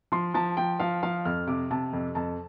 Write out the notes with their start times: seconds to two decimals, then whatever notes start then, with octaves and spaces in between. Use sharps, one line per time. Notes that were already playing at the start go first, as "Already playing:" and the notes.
0.12 F3 C6
0.34 F3 A5
0.57 F3 G5
0.80 F3 F5
1.03 F3 F5
1.25 F2 F6
1.47 C3 D6
1.70 C3 A5
1.93 F2
2.15 F2 A5